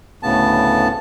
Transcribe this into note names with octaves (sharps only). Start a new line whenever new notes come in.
D2 A2 C#3 B3 A5